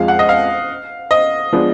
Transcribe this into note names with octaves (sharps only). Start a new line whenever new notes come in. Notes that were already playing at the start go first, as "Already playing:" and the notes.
Already playing: F2 F3 G#3 F5
F#5
D#5
F5
D#5
F3 G#3 B3 D4